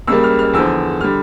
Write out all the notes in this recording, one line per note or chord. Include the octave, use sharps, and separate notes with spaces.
C#2 C#3 G3 A#3 E6
F6
F6
E2 D3 F3 E6
D3 G3 F6